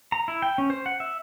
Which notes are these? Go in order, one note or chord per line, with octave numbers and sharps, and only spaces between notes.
A#5
E4
G5
C#4
C5
F#5
E5